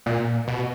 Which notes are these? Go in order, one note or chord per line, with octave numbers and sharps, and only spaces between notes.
A#2
B2